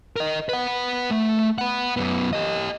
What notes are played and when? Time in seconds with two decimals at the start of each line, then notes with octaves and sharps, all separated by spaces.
0.16 A#4 D#5
0.49 B4 F#5
1.11 A3
1.58 F#5 B5
1.97 F#2 B3
2.33 G4 D#5